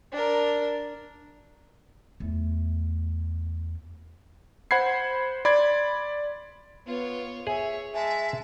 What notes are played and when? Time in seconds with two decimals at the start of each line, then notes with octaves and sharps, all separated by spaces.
0.12 D4 A#4
2.20 E2 A3
4.71 C5 F#5 B5 G#6 C7
5.45 D5 B5 C6 G#6
6.86 B3 F4 C#5
7.47 G#4 C#5 E5
7.94 G#3 E5 G#5 A5